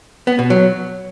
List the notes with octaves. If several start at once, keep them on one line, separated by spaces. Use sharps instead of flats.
B3
B2
F#3